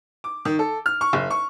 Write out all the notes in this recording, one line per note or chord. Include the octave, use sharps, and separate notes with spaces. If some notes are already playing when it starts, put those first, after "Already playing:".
D6
D#3
A4
F6
C#6
F#1
C#6